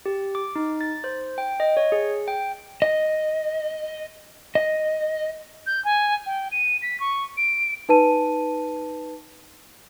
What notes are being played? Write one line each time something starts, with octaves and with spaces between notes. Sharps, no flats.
G4
D6
D#4
A6
C5
G5
D#5
C#5
G#4
G5
D#5
D#5
G6
G#5
G5
D#7
B6
C#6
D7
D#4 B4 A5 D#7